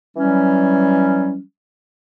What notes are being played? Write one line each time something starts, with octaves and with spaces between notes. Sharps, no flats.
E3 F#3 G3 C#4